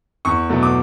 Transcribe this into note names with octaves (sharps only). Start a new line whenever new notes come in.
E2 C#6
B2 F#3 A3
D6